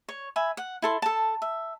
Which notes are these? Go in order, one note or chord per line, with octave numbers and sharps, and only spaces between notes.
C#5
E5 G#5 B5
F#5
E4 A4 C6
A4 A5
E5